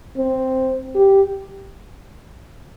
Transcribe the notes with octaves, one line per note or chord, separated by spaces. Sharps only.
C4
G4